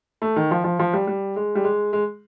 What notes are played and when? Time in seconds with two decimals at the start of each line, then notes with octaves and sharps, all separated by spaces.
0.22 A3
0.36 D#3
0.51 F3
0.64 F3
0.79 F3
0.93 G3
1.07 G3
1.36 G#3
1.55 G3
1.64 G#3
1.93 G#3